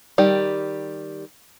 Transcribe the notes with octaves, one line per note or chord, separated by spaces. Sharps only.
D#3 G3 G4